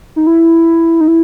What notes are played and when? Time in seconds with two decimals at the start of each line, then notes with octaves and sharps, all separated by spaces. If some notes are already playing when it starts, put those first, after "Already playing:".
0.16 D#4
0.27 E4
1.01 D#4
1.08 E4